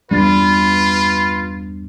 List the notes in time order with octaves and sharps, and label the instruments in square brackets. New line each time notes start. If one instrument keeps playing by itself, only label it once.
[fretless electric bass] E2 G3 [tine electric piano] G2 [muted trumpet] F4 [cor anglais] B4